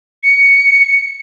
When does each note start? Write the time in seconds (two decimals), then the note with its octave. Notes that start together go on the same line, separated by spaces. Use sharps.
0.23 C#7